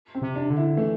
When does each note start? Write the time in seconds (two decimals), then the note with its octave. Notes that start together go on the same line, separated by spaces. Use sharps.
0.15 C4
0.22 C3
0.35 D4
0.50 D3
0.57 E4
0.77 E3 A3